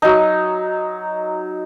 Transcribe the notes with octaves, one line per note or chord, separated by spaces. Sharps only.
F#3 D#4